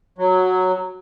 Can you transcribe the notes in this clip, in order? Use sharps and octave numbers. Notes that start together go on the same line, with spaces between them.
F#3